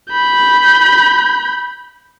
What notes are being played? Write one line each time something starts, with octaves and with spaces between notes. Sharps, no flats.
B5 G6